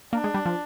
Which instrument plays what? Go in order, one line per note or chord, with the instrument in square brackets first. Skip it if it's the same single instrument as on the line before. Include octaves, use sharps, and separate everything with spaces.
[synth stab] A#3 [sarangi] D4
[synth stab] G#3
G3
F3